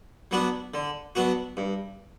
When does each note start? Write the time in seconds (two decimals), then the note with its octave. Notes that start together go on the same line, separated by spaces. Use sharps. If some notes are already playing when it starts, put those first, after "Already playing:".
0.31 F#3 B3 D4 F#4
0.74 D3
1.15 F#3 B3 D4 F#4
1.57 G2